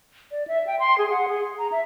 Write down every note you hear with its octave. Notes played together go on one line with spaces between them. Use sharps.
D5
E5
G5
C6
G#4
F#5
G#4
A#5
E5